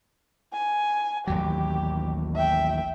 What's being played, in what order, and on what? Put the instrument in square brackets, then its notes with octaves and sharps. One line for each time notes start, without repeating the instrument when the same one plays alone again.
[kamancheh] G#5
[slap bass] A1 D#2 F#3 [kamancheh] G4
[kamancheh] E5 G5